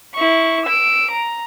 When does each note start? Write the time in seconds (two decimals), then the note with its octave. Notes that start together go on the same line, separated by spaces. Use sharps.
0.15 E4 C#6
0.66 E6 D7
1.11 A#5